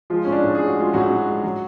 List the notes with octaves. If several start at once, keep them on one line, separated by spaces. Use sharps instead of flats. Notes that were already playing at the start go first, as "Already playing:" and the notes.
F3 G#3 F4
A2 C#4
D4
A2
G#4
G#3
F#4
G#3 F4
A2 F#3 F#4
A2
G#3
F#3